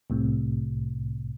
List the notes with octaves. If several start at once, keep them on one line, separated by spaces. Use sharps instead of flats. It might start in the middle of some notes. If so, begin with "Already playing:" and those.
C2 A2 C3